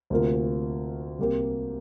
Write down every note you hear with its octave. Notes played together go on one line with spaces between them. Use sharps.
D2 C3 A#3 F4 A#4
C2 C3 A#3 G4 A#4